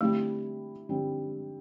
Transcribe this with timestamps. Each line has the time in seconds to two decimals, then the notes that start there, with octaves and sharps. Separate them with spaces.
0.01 D3 G3 A3 C4 E4
0.89 D3 G3 C4 E4